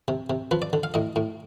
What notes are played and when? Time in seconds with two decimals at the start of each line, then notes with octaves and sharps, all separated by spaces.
0.08 C3
0.30 C3
0.51 F3 B4
0.62 D5
0.73 D3
0.83 F5
0.94 A2 D#5
1.16 A2